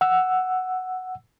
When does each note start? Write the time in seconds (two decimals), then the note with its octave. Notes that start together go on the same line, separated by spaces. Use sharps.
0.01 F#5 E6